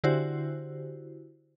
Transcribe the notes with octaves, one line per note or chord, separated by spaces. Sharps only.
D3 E4 F#4 G4 C5